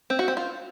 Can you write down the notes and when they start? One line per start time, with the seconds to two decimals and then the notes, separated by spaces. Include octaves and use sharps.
0.10 C4
0.19 F#4
0.28 C4
0.37 F4